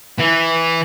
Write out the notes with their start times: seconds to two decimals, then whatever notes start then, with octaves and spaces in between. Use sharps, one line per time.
0.18 E3